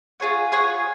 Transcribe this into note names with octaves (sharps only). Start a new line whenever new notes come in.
F4 G#4 C#5 F#5
F4 G#4 C#5 F#5